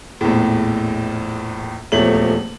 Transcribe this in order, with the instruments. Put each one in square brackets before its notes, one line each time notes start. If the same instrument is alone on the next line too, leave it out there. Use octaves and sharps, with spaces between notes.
[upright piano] A#1 E2 A2
D#1 E2 F3 A3 C#5 F#7